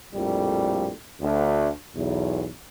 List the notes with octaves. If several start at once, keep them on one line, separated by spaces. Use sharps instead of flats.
A#1 F2 A2 G3
D2
B1 E2